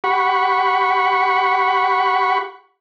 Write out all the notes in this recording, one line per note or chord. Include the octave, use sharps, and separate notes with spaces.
G4 F#5 B5 C#6